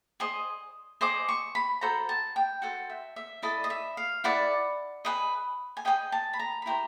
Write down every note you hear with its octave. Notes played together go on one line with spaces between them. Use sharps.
G#4 C5 D#5 D#6
G#4 C5 D#5 D6
C#6
B5
F#4 A4 C5 A#5
A5
G5
F#4 A4 C5 F#5
E5
E5
E4 A4 D5 D#5
D#5
E5
F5
E4 A4 D5 F#5
G#4 B4 D#5
G#5
G#4 B4 D#5 G5
A5
B5
A#5
B5
E4 G4 C5 A#5